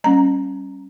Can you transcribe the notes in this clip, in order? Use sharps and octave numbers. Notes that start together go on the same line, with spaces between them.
G3 A#3 C#4 A#5